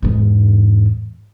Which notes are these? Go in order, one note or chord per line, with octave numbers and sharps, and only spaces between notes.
E2 G#2